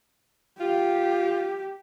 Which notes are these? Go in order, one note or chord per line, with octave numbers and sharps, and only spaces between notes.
F4 G4